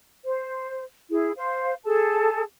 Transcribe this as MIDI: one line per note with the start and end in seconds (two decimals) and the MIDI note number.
0.25 0.84 72
1.10 1.31 64
1.10 1.31 68
1.36 1.74 72
1.36 1.74 77
1.84 2.43 68
1.84 2.43 69
1.84 2.43 81